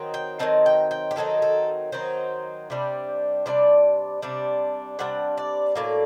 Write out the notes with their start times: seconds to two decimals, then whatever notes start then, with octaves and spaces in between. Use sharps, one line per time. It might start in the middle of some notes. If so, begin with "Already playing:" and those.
Already playing: D#3 F#3 C4 D#4
0.14 G5
0.39 D#3 F#3 C4 D#4 A5
0.66 G5
0.91 G5
1.11 G4
1.16 D#3 F#3 C4 D#4 A4
1.42 A4
1.92 D#3 F#3 C4 D#4 C5
2.70 C3 G3 D4
3.46 C3 G3 D4 D5
4.22 C3 G3 D4
4.99 C3 G3 D4 F#5
5.38 D5
5.75 A2 F#3 A#3 D5